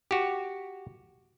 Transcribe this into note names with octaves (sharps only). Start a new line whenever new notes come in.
F#4 G4